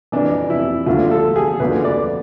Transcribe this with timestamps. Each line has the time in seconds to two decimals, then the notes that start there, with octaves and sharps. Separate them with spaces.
0.12 F2 E3 D4
0.50 E4
0.86 D2 D3 F3 F4
1.11 A4
1.36 G#4
1.60 D2 D3 F3 B4
1.84 D5